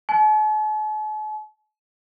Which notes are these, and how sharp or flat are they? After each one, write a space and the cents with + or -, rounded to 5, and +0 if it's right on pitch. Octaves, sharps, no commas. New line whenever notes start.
A5 -45